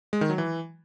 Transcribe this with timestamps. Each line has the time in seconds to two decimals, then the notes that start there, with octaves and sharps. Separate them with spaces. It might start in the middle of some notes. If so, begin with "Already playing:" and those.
0.13 G#3
0.21 D#3
0.30 F#3
0.38 E3